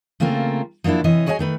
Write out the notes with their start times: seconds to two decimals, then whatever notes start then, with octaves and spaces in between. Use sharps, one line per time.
0.20 C#3 A3 A#3 C4 F4 A#4
0.84 F3 F#3 A#3 D4 E4
1.04 C3 E3 C#5 D#5
1.26 F#4 G#4 C#5 D#5 E5 G#5
1.39 D#3 A3 B4